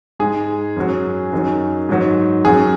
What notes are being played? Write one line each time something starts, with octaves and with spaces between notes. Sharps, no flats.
G#2 G#3 G#4
F#2 F#3
F#2 D#3 F#3
G#2 D#3 F#3
F#2 F#3 G#4